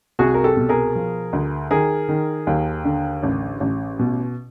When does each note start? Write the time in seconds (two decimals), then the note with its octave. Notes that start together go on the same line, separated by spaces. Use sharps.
0.19 C2 F#4 G#4
0.34 A#4
0.44 G4 A4
0.57 B2
0.69 G#4 A#4
0.95 F3
1.33 D2
1.71 D#3 G#4 A#4
2.09 D#3
2.47 D#2
2.85 D3
3.23 A1
3.60 A1
3.99 B2